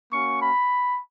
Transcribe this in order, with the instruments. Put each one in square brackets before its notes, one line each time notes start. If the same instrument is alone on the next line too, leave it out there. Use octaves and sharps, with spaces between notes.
[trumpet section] A#3 C#4 F#4 C#6
B5